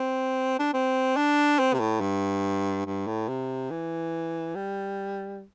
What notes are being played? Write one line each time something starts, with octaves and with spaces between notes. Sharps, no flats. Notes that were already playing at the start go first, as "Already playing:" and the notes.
Already playing: C4
D4
C4
D4
C4
C3
A2
G2
G2
A2
C3
E3
G3